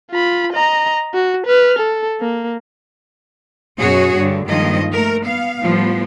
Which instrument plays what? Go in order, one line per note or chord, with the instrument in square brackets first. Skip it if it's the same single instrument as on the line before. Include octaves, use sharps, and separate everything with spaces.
[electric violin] F4 B5
D#5 A#5
F#4
B4 F6
A4
A#3
[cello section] F#2 B2 F#4 G#4 C#5
G2 D3
G2 D#3 F3 G#3 A#3 D#5
A3 A#4
B3 F5
A2 F3 G3 B3